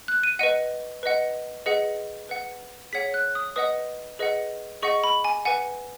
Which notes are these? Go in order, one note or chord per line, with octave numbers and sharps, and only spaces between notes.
F#6
D#7
B4 D#5 F#5 D#7
B4 D#5 F#5
G#4 B4 D#5 F#5 C#7
B4 F#5
G#4 C#5 F#5 B6
F#6
D#6
B4 D#5 F#5 D#6
G#4 B4 D#5 F#5
G#4 D#5 F#5 C#6
B5
G#5
B4 F#5 G#5